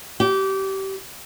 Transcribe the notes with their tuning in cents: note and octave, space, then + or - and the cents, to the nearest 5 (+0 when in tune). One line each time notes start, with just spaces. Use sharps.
G4 -25